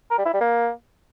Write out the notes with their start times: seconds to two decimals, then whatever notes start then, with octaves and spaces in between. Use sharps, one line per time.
0.11 A#4
0.18 G3
0.26 E4
0.33 G3
0.41 A#3